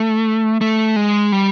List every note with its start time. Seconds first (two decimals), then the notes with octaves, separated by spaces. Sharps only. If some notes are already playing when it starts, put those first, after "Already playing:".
Already playing: A3
0.61 A3
0.96 G#3
1.32 G3